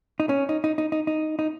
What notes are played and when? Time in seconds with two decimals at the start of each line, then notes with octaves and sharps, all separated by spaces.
0.20 D#4
0.29 C#4
0.49 D#4
0.64 D#4
0.78 D#4
0.92 D#4
1.07 D#4
1.39 D#4